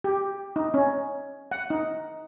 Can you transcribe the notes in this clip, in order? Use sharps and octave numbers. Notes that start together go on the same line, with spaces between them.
G4
D#4
C#4
F#5
D#4